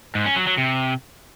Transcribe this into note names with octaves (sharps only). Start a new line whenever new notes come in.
G#2
C#4
F#3
F#3
C3